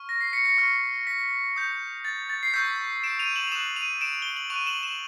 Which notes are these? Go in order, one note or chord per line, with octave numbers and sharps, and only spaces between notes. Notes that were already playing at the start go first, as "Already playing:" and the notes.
Already playing: C#6 F6
A#6
C7
B6 C#7
B6 C#7
C#6 F6
B6
D#6 G6
A6
A6
C7
C#6 E6 G6 B6
D7 E7
D#7 F7
E7 F#7
F7
D#6 F#6 E7 F#7
D#7 F7
D7 E7
G7
F#7
C#6 F#6 D#7 F7
E7 F#7
E7 F#7